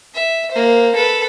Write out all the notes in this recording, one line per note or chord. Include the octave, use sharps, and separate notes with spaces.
E5
A#3 C5
A4 B4